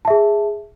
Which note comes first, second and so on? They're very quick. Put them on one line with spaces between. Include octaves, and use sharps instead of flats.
A5 E5 G#4